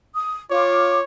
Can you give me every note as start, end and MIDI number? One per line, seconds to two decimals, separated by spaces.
0.15 0.40 87
0.51 0.99 65
0.51 1.04 73
0.51 0.99 86